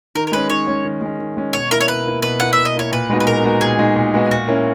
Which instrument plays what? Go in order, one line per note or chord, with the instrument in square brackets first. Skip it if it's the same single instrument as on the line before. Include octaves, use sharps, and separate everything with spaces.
[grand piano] D#3 [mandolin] A#4
[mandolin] A#4
[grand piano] G#3 C#4 [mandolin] B4
[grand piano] D#3 [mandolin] C#5
[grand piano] G#3 C#4
D#3
G#3 C#4
D#3
G#3 C#4
[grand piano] B2 [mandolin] C#5
[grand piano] A#3 E4 [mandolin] A#4
[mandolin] C#5
[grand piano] B2 [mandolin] B4
[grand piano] A#3 E4
[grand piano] B2 [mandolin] B4
[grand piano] A#3 E4 [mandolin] F#5
[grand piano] B2 [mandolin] E5
[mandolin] D#5
[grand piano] A#3 E4 [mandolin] C#5
[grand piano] A#2 [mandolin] B4
[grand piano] G#3 B3 D#4 F#4
[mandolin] B4
[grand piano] A#2 [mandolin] A#4
[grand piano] G#3 B3 D#4 F#4
[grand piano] A#2 [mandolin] G#4
[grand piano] G#3 B3 D#4 F#4
A#2
G#3 B3 D#4 F#4
[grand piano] A#2 [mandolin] F#4
[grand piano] A#3 C#4 E4